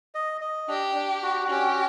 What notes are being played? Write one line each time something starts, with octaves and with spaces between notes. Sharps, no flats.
D#5
D#5
D4 G4
D4
F#4
C#4 G4